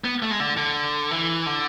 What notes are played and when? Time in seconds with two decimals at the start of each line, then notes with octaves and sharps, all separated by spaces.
0.04 B3
0.22 A3
0.31 G#3
0.40 D3
0.57 D3
1.11 E3
1.46 D3